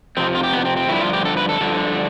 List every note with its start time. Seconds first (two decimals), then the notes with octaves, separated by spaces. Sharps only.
0.17 F2 C3 F3 C4
0.35 F4
0.43 G4
0.53 B3
0.65 C4
0.77 C4
0.89 G2 D3 F3 E4
1.01 F4
1.13 G4
1.25 A4
1.37 B4
1.49 A4
1.61 G2 D3 F3